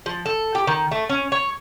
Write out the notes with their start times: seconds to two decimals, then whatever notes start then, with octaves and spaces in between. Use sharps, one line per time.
0.06 F3
0.26 A4
0.55 G4
0.67 D#3
0.91 A3
1.09 C#4
1.32 C#5